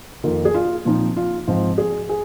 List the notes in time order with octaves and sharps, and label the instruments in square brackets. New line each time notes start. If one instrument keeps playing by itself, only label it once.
[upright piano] F2 D#3 A#3 F4 A#4
[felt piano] G#4
F4
[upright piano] A#2 F3 C4 D#4
[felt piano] F4
[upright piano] G#2 F3 C4
[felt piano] G#4
[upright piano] G#4